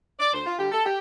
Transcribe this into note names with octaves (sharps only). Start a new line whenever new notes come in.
D5
D2 C5
F4
D3 G3 G4
A4
G4